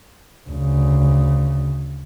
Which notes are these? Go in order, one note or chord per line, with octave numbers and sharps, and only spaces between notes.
D2 C#3